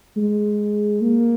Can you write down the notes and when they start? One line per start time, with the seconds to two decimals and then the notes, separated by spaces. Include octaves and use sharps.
0.17 G#3
1.01 A#3